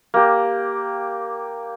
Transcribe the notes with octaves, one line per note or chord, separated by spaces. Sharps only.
A#3 G4